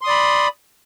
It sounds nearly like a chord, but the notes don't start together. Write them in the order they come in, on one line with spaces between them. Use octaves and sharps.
C6 D#6 D5 B5